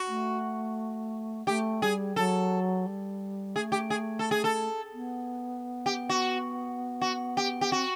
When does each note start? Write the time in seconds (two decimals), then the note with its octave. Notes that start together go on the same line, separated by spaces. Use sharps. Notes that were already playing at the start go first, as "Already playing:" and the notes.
Already playing: F#4
0.08 A3
1.47 A3 G4
1.82 G3 G#4
2.16 F#3 A4
2.86 G3
3.55 A3 G#4
3.72 G4
3.90 G#4
4.19 A4
4.31 G#4
4.44 A4
4.94 B3
5.86 G4
6.09 F#4
7.01 F#4
7.37 G4
7.61 G4
7.72 C4 F#4